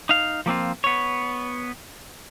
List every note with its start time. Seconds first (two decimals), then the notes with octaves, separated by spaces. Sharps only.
0.09 D#4 F5
0.46 F3 A#3 C4 F4
0.84 B3 C#5